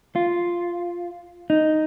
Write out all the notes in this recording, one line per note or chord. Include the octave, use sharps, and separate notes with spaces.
F4
D#4